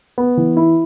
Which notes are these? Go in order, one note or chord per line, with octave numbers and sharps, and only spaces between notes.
B3
E3
E4